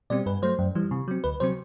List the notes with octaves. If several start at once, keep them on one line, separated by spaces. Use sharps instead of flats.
B2 G3 C4 D5
G2 B4
F#3 A3 C5
F#2
E3 G3
C3
F#3 C4
D2 B4
C3 F#3 C4 C5